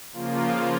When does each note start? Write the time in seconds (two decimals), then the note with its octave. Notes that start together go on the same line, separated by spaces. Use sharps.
0.13 C#3 F3 A#3 F4